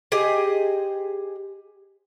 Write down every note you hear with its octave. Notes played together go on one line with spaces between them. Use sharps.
G4 G#4 C5 D#5